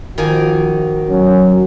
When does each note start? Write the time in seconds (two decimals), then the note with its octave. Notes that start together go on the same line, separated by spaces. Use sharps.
0.18 D#3 F3 A#3 F#4 G#5
1.09 F#3 C#4